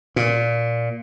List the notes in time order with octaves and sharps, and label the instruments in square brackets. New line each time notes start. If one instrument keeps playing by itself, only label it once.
[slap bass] A#2